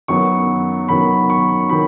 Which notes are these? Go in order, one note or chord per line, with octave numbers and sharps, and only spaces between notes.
F#2 D#3 F#3 B3 C#6
F#2 D#3 F#3 B3 B5
C#6
D#3 F#3 B3 B5